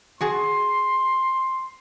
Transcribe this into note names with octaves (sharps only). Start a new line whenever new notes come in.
F#4 G#4 A5 C6